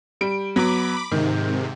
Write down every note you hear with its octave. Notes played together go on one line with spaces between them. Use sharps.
G3 D7
F#3 B3 B5 D6
G#2 C3 D#3